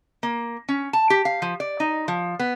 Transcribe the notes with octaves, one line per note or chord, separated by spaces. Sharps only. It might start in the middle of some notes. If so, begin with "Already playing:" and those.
A#3
C#4
A5
G4
F5
F3
D5
D#4
F3
B3